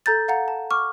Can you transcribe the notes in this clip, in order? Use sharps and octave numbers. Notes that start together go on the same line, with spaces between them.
A4 A#5 G6 A6
F5 F#5 A#5
A5
C#6 D6 F6